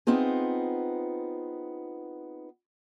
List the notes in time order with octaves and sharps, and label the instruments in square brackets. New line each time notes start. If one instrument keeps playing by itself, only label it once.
[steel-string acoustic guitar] B3 C4 D#4 F4 G#4